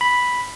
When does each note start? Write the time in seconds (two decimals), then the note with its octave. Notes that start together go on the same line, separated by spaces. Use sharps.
0.01 B5